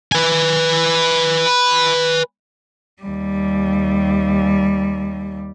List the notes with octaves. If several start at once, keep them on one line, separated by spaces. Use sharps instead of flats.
B4 G#5
D#2 G3